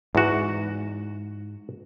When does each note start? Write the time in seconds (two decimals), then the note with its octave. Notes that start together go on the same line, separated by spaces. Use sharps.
0.15 E2 G#2 F#4